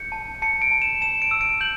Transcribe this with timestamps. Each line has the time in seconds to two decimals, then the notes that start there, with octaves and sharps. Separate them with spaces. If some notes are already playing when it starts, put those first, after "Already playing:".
Already playing: G6 C#7
0.12 A5
0.42 A5 C#7
0.62 D7
0.71 A5
0.82 E7
1.01 A5 E7
1.22 D7
1.31 E6
1.41 D7
1.61 G6 F#7